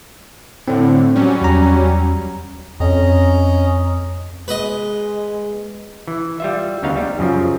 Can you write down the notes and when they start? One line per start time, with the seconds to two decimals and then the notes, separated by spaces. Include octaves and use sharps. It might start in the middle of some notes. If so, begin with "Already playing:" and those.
0.68 A2 D3 C4
1.15 F#3 G3 C#4
1.42 E2 A#5
2.80 F2 C#4 D#5 A#5
4.48 G#3 B4 D#5
6.08 E3
6.40 G3 F4 E5
6.83 D2 C#3 B3 D#4 F5
6.96 G3
7.19 F#2 C#3 F3